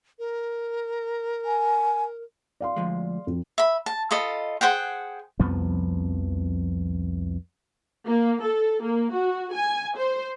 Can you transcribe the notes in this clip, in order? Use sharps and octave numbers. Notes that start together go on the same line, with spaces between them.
A#4
G#5
D5 F5 C6
D2 F3 G#3
F2
E5 B5
A5
F4 A4 D#5 B5
G#4 C5 F#5 G5
C2 F2 F3 B3
A#3
A4
A#3
F#4
G#5
C5